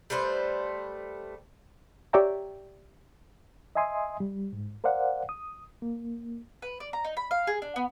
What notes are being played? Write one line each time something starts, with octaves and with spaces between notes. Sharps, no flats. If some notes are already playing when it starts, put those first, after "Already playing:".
G3 A3 B4 C5
G4 C#5 D5 E5 G5 A#5
D#5 E5 G#5 C6 D#6
G3
G#2
A#4 C5 D5 F5 F#5
D#6
A#3
B4
D5
A#5
D#4
B5
F5
G#4
D4
B3